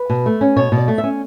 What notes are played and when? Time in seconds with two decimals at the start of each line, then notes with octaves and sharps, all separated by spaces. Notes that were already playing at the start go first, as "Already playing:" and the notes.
Already playing: B4
0.09 B2
0.26 A3
0.41 C#4
0.56 B2 C#5
0.72 B2
0.77 D5
0.88 A3
0.98 E5
1.03 C#4